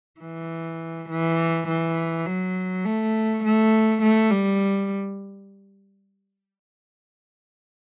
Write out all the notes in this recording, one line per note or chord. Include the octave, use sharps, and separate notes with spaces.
E3
E3
E3
F#3
A3
A3
A3
G3